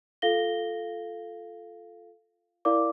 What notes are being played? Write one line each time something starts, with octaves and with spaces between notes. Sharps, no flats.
F4 A4 F5 A#6 G7
E4 A#4 D5 F5 D6